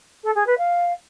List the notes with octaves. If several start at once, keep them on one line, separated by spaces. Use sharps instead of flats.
A4
G#4
B4
F5